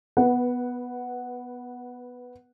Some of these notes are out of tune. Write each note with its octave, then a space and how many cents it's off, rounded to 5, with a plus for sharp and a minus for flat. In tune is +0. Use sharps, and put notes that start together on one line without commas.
B3 +0 B4 -15 F#5 +0